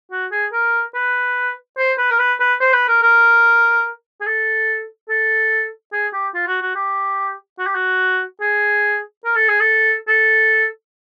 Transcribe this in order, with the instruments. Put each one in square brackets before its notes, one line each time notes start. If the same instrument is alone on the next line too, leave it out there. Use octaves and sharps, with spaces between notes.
[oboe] F#4
G#4
A#4
B4
C5
B4
A#4
B4
B4
C5
B4
A#4
A#4
G#4
A4
A4
G#4
G4
F4
F#4
F#4
G4
F#4
G4
F#4
G#4
A#4
A4
G#4
A4
A4